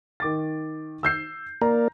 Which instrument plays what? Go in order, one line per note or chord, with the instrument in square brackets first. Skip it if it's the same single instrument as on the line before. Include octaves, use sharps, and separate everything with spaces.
[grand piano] D#3 D6 A6
E6 G6 C7
[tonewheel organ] A#3 A#4 D5 [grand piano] A#5